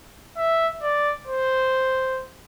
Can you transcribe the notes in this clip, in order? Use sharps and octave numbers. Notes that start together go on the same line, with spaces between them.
E5
D5
C5